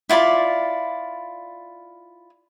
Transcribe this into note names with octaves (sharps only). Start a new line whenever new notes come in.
E4 F4 D5 B5